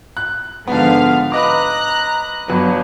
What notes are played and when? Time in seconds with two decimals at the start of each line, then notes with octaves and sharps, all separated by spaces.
0.17 F#6
0.67 G#2 D3 F3 B3 F5
1.32 B4 D#5 A#5 D6 F#6
2.48 G1 F#3 B4